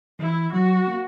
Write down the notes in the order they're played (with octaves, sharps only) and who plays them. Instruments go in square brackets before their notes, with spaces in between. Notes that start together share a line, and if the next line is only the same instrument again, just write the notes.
[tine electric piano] E3 [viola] E4
[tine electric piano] F#3 [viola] F#4
[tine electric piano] A#3